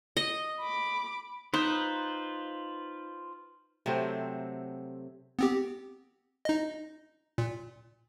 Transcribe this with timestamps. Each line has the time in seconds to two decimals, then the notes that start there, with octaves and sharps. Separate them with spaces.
0.17 D#5
0.61 B5 D6
1.54 D#4 F4 B4 C5
3.86 C3 F#3 A3 C4
5.39 B3 C4 G4
6.45 D#4 D#5
7.38 A#2